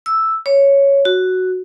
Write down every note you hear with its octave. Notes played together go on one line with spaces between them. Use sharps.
E6
C#5
F#4